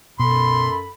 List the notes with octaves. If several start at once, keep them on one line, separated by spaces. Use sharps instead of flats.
F#2 B2 A4 B5 C6